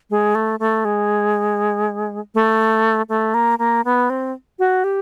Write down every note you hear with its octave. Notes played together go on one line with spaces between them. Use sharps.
G#3
A3
A3
G#3
A3
A3
A#3
A#3
B3
C4
F#4
G4